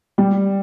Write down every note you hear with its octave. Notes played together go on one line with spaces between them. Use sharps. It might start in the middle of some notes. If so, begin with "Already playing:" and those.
G3